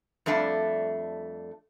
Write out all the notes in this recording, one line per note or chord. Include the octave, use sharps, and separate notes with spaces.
F2 G3 A3 D4 E5